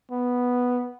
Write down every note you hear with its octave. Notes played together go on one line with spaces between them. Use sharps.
B3